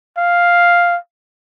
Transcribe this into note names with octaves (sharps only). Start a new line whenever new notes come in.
F5